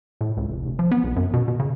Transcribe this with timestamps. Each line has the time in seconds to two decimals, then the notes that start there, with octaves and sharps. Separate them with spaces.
0.21 A2
0.37 C#2
0.49 F1
0.65 F1
0.79 F3
0.91 B3
1.04 B1
1.16 F#2
1.33 B2
1.48 B2
1.60 C#3